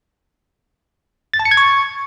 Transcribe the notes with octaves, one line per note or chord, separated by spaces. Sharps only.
A6
A5
C#7
G#6
C#6